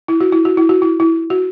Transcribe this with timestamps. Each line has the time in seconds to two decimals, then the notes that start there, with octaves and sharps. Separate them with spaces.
0.08 E4
0.20 F#4
0.32 E4
0.45 F#4
0.57 E4
0.69 F#4
0.82 E4
1.00 E4
1.30 F#4